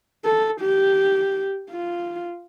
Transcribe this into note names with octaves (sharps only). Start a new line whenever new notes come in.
A4
G4
F4